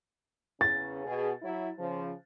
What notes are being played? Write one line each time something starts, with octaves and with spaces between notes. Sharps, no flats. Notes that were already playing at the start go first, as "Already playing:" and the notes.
E2 C#3 C#4 A6
B2 G#4
F#3 E4
C#3 F3